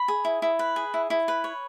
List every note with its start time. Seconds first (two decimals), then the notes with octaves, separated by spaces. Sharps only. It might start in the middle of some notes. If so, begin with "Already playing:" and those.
Already playing: B5
0.08 G#4
0.25 E4
0.42 E4
0.59 B4
0.76 G#4
0.94 E4
1.10 E4
1.28 B4
1.44 C#5